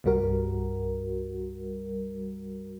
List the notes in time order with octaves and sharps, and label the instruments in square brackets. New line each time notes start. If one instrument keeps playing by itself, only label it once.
[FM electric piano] C2 G2 G3 F#4 A#4